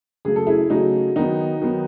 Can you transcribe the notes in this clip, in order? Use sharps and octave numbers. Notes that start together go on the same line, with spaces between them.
C#3 F#3 A3 G#4
A4
E4 G#4
C#3 F#3 A3 D#4 F#4
D#3 F#3 B3 D#4 F#4
D#3 F#3 B3